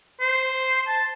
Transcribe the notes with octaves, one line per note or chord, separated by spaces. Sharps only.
C5
A5